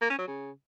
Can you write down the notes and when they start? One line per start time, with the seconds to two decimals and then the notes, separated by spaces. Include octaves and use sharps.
0.01 A#3
0.10 C#4
0.18 F#3
0.27 C#3